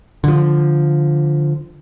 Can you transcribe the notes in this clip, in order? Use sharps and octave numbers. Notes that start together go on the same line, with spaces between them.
D3 F3